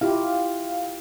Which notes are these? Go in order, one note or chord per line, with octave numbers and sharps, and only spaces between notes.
E4 F4 G4 F5